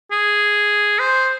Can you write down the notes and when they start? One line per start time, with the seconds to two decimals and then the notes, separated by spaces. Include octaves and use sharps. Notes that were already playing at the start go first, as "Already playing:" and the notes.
0.12 G#4
0.99 C5